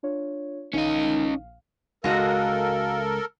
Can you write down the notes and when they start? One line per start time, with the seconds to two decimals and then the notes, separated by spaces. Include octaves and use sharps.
0.03 D4 F4 C#5
0.73 A#1 D#3 C#4 D#5 F5
2.04 C#2 G#3 F#4 A4 A#4 D#5 F5